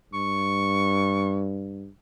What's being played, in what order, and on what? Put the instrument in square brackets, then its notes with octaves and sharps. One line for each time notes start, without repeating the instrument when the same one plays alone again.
[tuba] G2 [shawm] C#6